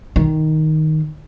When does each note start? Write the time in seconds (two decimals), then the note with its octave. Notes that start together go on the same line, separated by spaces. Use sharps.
0.16 D#3